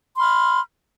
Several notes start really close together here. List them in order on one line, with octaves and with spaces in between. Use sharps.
C6 B5 F6